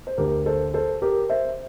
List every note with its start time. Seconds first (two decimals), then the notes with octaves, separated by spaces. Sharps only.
0.07 C5
0.17 D2 D3 G4 A#4
0.46 A4 C5
0.74 A4 C5
1.02 G4 A#4
1.29 C5 E5